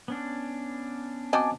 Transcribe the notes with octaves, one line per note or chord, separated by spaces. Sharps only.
B3 C#4 D4
C4 F#4 D#5 G#5 A5 D6